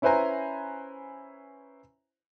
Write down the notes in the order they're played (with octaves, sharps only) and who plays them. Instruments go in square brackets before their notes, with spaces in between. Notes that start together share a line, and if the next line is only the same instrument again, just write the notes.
[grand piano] C#4 E4 B4 C5 G#5 A#5